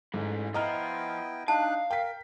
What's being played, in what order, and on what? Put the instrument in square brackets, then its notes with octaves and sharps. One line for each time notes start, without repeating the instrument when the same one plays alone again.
[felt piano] G#2 [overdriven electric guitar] E3 A3
[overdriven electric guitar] F3 [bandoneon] B3 E4 G5 [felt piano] D#5 A#5 F6
[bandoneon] D4 D#4 F#6 [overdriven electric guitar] F5 [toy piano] A5
[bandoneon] A#4 [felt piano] G5 B6